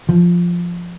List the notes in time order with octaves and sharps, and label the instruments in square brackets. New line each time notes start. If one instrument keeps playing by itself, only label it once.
[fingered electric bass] F3